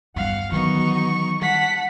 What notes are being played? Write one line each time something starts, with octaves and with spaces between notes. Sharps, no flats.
G2 G3 B3 F5 F#5
D#3 E3 F#3 B3 D#4 F#4 C#6
G3 F#5 A5 B6